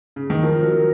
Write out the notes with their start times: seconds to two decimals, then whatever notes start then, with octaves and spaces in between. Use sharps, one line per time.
0.16 C#3
0.30 D#3
0.42 F3 A#4
0.63 F#3